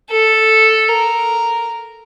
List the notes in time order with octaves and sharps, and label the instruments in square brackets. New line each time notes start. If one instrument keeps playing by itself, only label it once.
[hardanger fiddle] A4
A#4